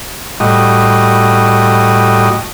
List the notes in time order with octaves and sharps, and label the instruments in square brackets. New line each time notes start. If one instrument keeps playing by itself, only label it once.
[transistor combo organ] A2 G3 F#4 D#5